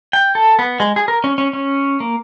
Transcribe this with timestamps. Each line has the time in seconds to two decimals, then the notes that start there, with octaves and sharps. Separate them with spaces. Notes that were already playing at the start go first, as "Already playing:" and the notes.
0.13 G5
0.35 A4
0.59 B3
0.80 G#3
0.96 G#4
1.08 A#4
1.24 C#4
1.38 C#4
1.53 C#4
2.00 A#3